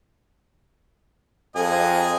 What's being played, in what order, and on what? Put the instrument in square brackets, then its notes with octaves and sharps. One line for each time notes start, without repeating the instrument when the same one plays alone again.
[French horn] F2 [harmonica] G#4 D#5 G#5